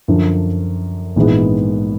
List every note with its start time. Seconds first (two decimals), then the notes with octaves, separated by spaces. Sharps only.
0.08 F#2 D3 F3
1.16 A#1 G#2 E3 G#3 B3